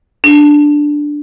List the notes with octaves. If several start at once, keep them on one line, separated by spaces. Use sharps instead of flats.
D4